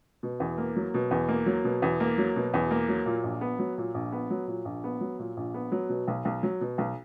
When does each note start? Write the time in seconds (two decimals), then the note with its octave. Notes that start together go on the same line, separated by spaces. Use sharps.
0.23 B2
0.40 E2
0.58 A#3
0.76 F#3
0.94 B2
1.11 E2
1.29 A#3
1.46 F#3
1.64 B2
1.82 E2
2.00 A#3
2.18 F#3
2.36 B2
2.54 E2
2.71 A#3
2.89 F#3
3.06 A#2
3.23 A#1
3.41 B3
3.59 F#3
3.78 A#2
3.94 A#1
4.12 B3
4.30 F#3
4.48 A#2
4.65 A#1
4.84 B3
5.01 F#3
5.19 A#2
5.37 A#1
5.54 B3
5.72 F#3
5.89 B2
6.08 B1
6.25 B1
6.43 F#3
6.61 B2
6.78 B1